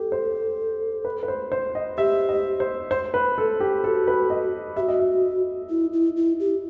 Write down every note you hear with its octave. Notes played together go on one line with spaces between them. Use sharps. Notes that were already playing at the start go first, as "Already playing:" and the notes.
Already playing: G4 A4
C5
B4
B4
C5
C5
D#5
G4 E5
D#5
C5
C5
B4
A4
G4
F#4 A4
B4
D#5
F#4 G4 E5
D#5
E5
E4
E4
E4
G4